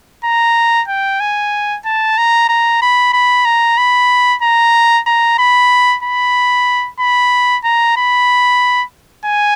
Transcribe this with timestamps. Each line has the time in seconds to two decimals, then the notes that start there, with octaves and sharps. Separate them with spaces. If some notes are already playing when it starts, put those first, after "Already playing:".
0.25 A#5
0.88 G5
1.20 G#5
1.85 A5
2.18 A#5
2.49 A#5
2.82 B5
3.13 B5
3.45 A#5
3.78 B5
4.42 A#5
5.06 A#5
5.39 B5
6.03 B5
7.00 B5
7.64 A#5
7.97 B5
9.25 G#5